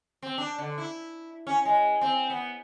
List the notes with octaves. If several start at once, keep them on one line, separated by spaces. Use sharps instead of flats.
C4
D4
D3
E4
C#4
G#3
C4
B3